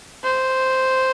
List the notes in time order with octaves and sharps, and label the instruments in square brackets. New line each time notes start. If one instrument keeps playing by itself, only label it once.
[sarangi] C5